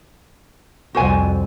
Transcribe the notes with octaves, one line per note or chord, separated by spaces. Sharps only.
C2 F2 F#4 C5 G#5